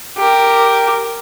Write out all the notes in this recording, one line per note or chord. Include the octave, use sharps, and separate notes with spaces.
G4 A#4